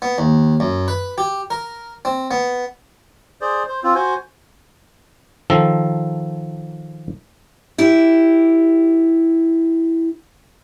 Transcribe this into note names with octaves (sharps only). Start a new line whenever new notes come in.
B3
D#2
F#2
B4
G4
A#4
C4
B3
G#4 C5 D5
C5
C4 F4
F#4 C5 G#5
D#3 F3 A4
E4 G4